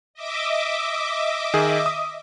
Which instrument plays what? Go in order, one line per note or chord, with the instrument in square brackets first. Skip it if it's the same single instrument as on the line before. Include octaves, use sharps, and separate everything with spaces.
[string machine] D#5 E5 D6
[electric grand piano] D#3 G#4
D#6